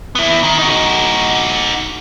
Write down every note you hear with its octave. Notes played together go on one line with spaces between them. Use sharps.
B3 E4
D#3
D#4 F#4